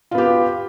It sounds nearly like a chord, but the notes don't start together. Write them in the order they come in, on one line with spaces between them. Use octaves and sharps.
F4 B3 G4